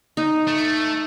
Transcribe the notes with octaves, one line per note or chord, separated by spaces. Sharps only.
D#4
A3